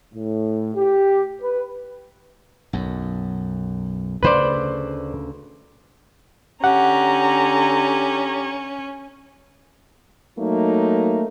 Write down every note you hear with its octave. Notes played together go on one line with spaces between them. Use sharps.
A2
G4
B4
B1 F#2
D2 C#3 A3 B4 C5 D5
D3 C#4 G4 F#5 A#5
F#3 A3 A#3 D#4